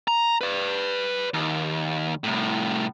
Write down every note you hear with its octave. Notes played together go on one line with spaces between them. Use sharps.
A#5
B4 D5
D#2
C2 A2